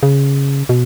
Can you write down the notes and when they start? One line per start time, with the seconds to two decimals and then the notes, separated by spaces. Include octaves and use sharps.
0.03 C#3
0.69 B2